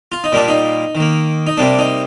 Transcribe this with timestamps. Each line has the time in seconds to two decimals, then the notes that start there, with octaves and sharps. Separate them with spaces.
0.12 F4
0.24 D#4
0.32 A#2 G3 A#3 D4
0.48 D#4
0.95 D#3
1.00 A#3
1.47 D#4
1.57 C3 G3 A#3 D4
1.79 D#4